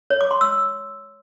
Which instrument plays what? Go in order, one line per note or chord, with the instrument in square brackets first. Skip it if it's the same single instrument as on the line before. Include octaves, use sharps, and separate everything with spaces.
[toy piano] C#5
D6
C6
E6